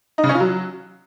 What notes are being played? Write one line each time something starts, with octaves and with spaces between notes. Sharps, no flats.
D#4
C#3
C#4
F4
F#3